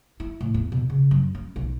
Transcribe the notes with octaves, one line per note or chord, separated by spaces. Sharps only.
E4
A2
E2
B2
C#3
F#2
C#4
B1